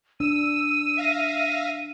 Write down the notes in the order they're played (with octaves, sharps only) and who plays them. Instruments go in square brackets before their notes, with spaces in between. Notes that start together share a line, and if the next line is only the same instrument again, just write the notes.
[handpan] D4 [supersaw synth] E6 [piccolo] D#7
[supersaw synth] E5 F5 A#6